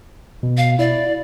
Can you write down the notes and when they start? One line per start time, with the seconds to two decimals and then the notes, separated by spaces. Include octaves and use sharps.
0.43 B2
0.57 F5
0.79 E4 D5